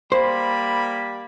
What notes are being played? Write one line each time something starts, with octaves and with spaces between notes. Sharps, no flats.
G3 A#3 C5 B5